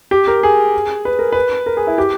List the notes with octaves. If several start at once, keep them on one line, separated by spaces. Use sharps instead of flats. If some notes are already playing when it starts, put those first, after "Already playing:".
G4
A#4
G#4
B4
A#4
B4
A#4
G#4
E4
G4